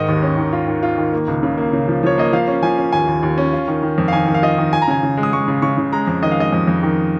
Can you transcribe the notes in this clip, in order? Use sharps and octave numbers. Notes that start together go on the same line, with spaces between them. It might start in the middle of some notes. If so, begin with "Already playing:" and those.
Already playing: G#2 D#3 D#5
D#2
C#4
D#3
F4
D#3
F4
D#3
A#3
C#2
C#3
A#3
C#3
F3
F3 C#5
A#3 D#5
F3 F5
C#4
F3 G#5
C#4
D#2 G#5
D#2
D#2
C#4
F4
D#3
D#3
F2
F5
D#3 G#5
D#3
F5
F4 D#5
D#3
F4 G#5
A#5
C#3 G#5
C#3
G#3
D#6
G#3 C#6
C#3
C#3 C#6
C#3
G#3 A#5
F2
D#3 D#5
F5
G#3 D#5
F2
F2
D#3